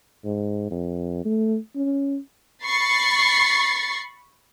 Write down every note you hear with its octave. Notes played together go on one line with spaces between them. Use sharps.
G#2
F2
A3
C#4
B5 C#6 A6 C7 C#7